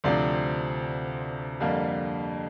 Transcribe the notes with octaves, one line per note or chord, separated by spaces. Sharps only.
D2 C3 F3 C4 D5
F2 D3 G3 A#3